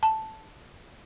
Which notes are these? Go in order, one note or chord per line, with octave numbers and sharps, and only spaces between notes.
A5